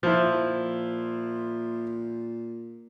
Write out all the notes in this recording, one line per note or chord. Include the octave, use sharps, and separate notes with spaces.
A#2 F3 E4